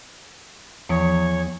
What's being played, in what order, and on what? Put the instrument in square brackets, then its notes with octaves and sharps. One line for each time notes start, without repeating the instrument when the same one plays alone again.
[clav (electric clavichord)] E2 [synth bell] F3 C#7 [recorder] C#5